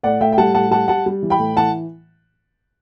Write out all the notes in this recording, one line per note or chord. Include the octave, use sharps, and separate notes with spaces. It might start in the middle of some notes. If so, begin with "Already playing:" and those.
A2 D5 F#5
A2 E5 G5
G5
G3 F#5 A5
A2 F#5 A5
G3 F#5 A5
G3 F#5 A5
G3
E3
G5 B5
A2
E3 F#5 A5